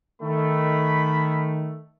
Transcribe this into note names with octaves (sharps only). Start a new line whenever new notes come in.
D#3 A3 B5